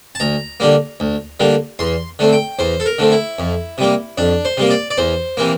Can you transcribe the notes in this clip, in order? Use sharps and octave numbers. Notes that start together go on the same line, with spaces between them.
A5
D2 A#5
D3 G3 A#3
D2
D3 G3 A#3
E2 C6
D3 A3 C4
G5
E2 C5
A4
A#4
D3 A3 C4
E4
F2
C3 G3 A#3
F2 D4
C5
C3 G3 A#3
D5
D5
E2 C5
C3 E3 A#3